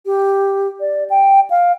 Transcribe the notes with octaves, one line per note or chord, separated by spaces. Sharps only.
G4
D5
G5
F5